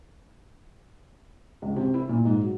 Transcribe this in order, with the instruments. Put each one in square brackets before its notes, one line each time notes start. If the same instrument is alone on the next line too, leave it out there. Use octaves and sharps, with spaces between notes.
[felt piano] C#2
C3
E4
A#2
G#2
F#3